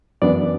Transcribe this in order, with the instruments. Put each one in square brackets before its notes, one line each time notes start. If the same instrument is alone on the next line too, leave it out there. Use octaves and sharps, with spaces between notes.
[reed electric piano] F#2 E3 B3 D4 D5